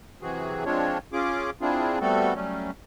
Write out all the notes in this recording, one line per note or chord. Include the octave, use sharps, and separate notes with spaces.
C3 E3 F#3 C4 F#4 G#4
F3 G#3 C4 D4 F4 C#5
C#4 F4 G#4 D6
C4 D4 E4 F4 G#4
G3 A3 B3 C4 F#4 A4
F#3 G3 A3 C#4